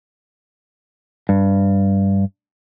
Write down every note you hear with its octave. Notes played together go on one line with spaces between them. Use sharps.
G2